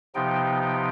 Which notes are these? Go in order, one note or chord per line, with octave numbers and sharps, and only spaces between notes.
C3 F3 B3 D#4 G5